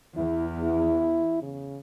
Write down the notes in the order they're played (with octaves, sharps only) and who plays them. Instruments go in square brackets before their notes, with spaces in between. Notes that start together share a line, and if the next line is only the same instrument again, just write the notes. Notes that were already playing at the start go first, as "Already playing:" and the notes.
[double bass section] E2 [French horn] E4
[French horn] E4
C#3